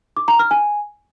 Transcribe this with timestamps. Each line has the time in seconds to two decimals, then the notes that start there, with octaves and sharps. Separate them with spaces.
0.17 D6
0.28 A#5
0.39 F6
0.51 G#5